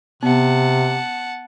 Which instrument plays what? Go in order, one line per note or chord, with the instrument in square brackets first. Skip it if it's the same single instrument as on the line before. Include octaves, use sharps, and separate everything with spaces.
[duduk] C3 [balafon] B3 [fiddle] F#5 A5